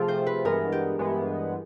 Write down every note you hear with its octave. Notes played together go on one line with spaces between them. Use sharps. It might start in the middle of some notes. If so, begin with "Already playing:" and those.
Already playing: C3 F3 A3 C4 F4 G#4
C5
B4
G2 E3 G#3 B3 A#4
G4
G2 E3 G#3 B3